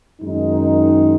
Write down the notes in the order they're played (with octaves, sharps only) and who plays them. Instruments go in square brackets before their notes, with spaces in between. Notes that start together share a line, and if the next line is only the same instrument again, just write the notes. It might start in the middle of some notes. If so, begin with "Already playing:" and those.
[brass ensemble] F#2 D#3 G#3 D#4